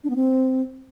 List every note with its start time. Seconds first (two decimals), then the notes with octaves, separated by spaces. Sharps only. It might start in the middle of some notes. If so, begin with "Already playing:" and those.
0.04 D4
0.10 B3
0.16 C4